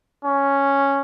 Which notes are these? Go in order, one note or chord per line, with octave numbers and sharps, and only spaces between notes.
C#4